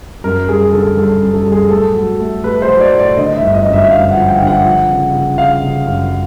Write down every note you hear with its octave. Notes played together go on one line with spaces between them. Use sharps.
F#2 A#4
G3 G#4
D3 A4
G3 A4
F#2
A4
G3
G#4
A2 A4
F#3
A3
A3 B4
C5
F#3
D5
A2
D5
D3 D#5
E5
G1
D#5
F#2
E5
G1 F5
F#5
F3
G5
D3
F#5
F3
C#3
C#3
C#3 F5
C#3
F#2